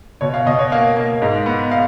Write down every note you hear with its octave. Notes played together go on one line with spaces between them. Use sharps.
B2 C#5
F5
B2 D#5
C#5
A#3 F5
A#3
G#2
B3
F5